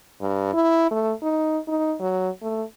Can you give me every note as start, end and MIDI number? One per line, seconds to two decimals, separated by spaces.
0.21 0.51 43
0.54 0.90 64
0.91 1.12 57
1.22 1.58 63
1.68 1.94 63
2.00 2.29 54
2.42 2.63 57